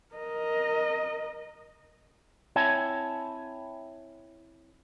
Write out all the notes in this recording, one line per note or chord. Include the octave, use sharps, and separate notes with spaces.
A#4 D#5
C4 E4 C#5 E5 G#5 A5